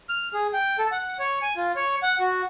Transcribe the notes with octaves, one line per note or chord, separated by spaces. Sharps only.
F6
G#4
G5
A4
F#5
C#5
G#5
F4
C#5
F#5
F#4